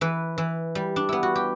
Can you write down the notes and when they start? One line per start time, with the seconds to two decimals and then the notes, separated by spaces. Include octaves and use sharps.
0.01 E3 B4
0.38 E3
0.75 G3
0.96 D4
1.09 B3 E4
1.23 F#4
1.36 G4